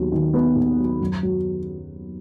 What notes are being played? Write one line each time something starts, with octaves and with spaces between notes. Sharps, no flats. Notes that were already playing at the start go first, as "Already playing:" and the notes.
Already playing: D#2 D#3 F#3 B3
D#3
B3
D#2
F#3
F#2
F#3